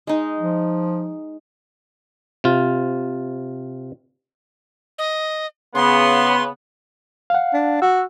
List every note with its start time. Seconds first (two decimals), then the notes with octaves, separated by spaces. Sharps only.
0.07 G#3 D#4
0.39 F3
2.44 C3 F4
4.98 D#5
5.75 C#3 B3 C6
7.30 F5 F#5
7.53 D4
7.82 F#4 E6